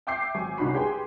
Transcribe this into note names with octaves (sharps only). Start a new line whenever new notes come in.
E5 G5 D6 E6 G6 C7
G#1 F#3 G#5 C#6
C2 C#4 D#4 F#4 B5 C7
G4 G#4 B4 G5 G#5 C6